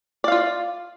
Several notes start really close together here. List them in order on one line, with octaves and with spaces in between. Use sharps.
D5 F5 F4